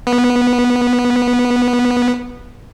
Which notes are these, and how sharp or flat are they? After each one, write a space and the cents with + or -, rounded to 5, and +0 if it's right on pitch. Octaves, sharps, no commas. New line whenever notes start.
B3 -15